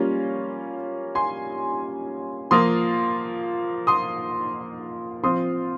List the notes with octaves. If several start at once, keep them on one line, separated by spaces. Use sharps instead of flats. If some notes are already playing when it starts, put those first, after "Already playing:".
Already playing: G3 A#3 C#4 F4
G#5 C6
F3 A#3 F4 C6 D#6
C6 D#6
F3 C4 F4 C6 D#6